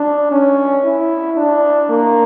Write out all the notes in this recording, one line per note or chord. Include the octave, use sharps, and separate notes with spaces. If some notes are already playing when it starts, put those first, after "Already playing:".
Already playing: D4
C#4
E4
D4
A#3